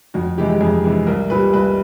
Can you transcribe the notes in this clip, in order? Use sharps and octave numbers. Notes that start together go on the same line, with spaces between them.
F2 F#4
C3 E3 G#3 G4
G4
F2 G#4
C3 E3 G#3
C2 A#4
A#2 G3 B4
C2 B4